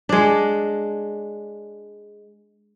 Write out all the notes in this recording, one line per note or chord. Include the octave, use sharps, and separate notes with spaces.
G#3 D4